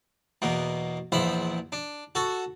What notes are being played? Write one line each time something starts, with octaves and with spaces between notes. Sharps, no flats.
E2 B2 A#3
A#1 E2 F3 E4 B5
D4
F#4 A4